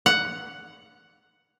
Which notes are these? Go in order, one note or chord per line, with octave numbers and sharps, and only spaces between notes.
F#5